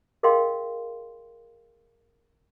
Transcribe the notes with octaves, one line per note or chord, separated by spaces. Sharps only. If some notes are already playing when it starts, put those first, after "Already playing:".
G#4 A#4 D#5 F5 G5 C6